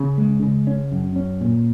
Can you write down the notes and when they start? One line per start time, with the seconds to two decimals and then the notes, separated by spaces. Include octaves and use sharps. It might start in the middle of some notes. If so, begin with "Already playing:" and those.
Already playing: C#3 C#4
0.18 G#3
0.43 C#3
0.67 C#4
0.92 F#2
1.16 C#4
1.41 A#2